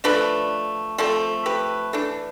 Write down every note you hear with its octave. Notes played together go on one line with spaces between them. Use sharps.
F3 A3 D4 B4 D5
F3 A3 C4 A4 C5
G4 B4
E3 A3 D4